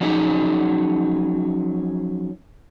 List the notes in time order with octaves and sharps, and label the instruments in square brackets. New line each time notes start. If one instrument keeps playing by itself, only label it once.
[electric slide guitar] F3 F#3 C#4 D#4 G#4